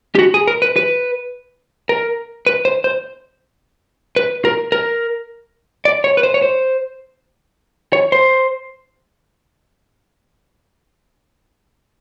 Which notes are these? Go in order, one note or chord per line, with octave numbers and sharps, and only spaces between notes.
G4
F#4
G#4
A#4
B4
B4
A#4
B4
C5
C5
B4
A#4
A#4
D5
C#5
B4
C5
C#5
C5
C#5
C5